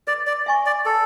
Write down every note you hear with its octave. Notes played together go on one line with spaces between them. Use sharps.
B4 D5
D5
E5 G#5 C#6
D5
A4 B4